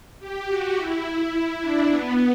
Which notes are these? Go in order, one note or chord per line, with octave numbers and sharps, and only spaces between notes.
G4
F#4
E4
D4
B3